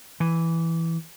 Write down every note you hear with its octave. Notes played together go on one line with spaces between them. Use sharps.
E3